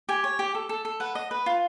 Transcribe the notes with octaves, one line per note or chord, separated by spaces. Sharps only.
G4 G#5
C#5
G4
A4
A4
A4
B4 F#5
D#5
B4
F4